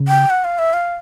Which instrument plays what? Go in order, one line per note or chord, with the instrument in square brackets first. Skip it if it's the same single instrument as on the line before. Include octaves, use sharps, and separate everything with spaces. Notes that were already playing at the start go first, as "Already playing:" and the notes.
Already playing: [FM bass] C#3
[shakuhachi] G5
F#5
F5
E5
F5